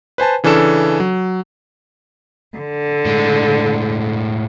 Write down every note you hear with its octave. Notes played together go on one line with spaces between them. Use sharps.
B4 C5 G#5 A5
C#3 E3 C#4 D4 A4 E7
F#3
D3
A2 G#3